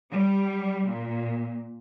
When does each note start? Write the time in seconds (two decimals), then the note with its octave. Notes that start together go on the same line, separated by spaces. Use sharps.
0.10 G3
0.87 A#2